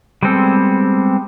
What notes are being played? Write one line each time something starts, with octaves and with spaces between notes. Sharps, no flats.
G3 G#3 B3 C4 A4